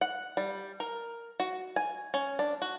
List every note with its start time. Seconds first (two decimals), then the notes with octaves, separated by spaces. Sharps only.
0.01 F#5
0.37 G3
0.80 A#4
1.40 F#4
1.76 G#5
2.14 C#4
2.39 D4
2.62 F#4